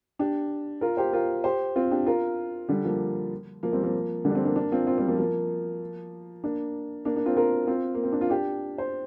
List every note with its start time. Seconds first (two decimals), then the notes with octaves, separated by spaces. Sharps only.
0.19 D4 G4
0.81 F4 A#4
0.97 G4 C5
1.13 F4 A#4
1.44 G4 C5
1.76 C4 F4
1.91 D4 G4
2.06 F4 A#4
2.68 D3 G3
2.84 F3 A#3
3.63 F3 A#3
3.73 G3 C4
3.83 F3 A#3
4.25 D3 G3
4.30 D4
4.35 G3 C4
4.45 A#3 D4
4.56 A#3 D4
4.72 C4 F4
4.87 C4 F4
4.98 G3 C4
5.08 F3 A#3
5.18 F3 A#3
6.44 A#3 D4
7.05 A#3 D4
7.16 A#3 D4
7.26 C4 F4
7.37 F4 A#4
7.67 C4 F4
7.94 A#3
8.04 C4
8.12 D4
8.21 F4
8.30 D4 G4
8.78 C5